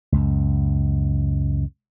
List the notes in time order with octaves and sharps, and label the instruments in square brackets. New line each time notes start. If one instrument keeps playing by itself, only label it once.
[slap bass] C#2 F#2